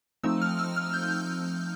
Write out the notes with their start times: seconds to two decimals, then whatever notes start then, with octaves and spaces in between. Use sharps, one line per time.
0.24 F3 A3 C4 D#4 E6
0.42 F6
0.59 E6
0.76 F6
0.94 G6